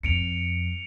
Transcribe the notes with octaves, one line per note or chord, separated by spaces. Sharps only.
F2 C#7 D7 F7